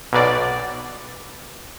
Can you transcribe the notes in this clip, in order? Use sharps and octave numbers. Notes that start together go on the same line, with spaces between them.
B1 B2 D5